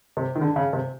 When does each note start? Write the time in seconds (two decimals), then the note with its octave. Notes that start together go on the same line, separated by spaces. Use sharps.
0.17 C3
0.35 D#3
0.41 D3
0.56 C#3
0.73 C3